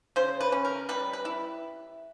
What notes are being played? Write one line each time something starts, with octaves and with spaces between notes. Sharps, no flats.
C#3 C5
B4
C#4
A#4
G3 B4
B4
E4